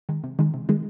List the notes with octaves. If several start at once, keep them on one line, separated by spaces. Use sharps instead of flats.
D#3 G#3
C3
D#3 G#3
C3
D#3 G#3